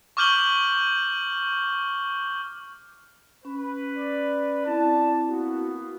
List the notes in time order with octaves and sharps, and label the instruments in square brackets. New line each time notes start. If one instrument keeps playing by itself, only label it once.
[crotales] C#6 D6 F6 G6 F#7 G7
[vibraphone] C#4 [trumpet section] B4
[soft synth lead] D5
[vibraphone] C4 E4 [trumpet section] A5
[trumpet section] A#3 B3 [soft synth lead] F#4